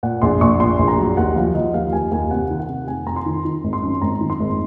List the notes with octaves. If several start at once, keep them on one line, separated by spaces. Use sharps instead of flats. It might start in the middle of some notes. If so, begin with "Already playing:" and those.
A#2 F#5
A#1 C6
A#1 C#6
A#2 C6
A#1
A#5
F#3
D#2 F#5
F3 F5
F3 D#5
D#2 F5
D#2 G#5
D#2 G#5
C3 F#5
D#3
F#5
C3
F2 G#5
F2 A#5
C6
D#3
D#3
G#1
C6
F#2
G#1 A#5
D#3
C6
G#1